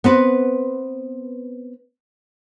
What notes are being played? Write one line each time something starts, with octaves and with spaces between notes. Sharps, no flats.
B3 C4 B4